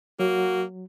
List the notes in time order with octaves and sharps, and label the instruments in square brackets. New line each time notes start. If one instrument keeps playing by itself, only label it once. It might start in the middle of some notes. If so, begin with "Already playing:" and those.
[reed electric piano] F#3 [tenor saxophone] A#3 [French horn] F#4